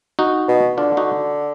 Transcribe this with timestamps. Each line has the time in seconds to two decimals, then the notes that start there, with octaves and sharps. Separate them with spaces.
0.19 D#4 F#4
0.48 B2
0.77 D3 D4 F4
0.97 D#4 F#4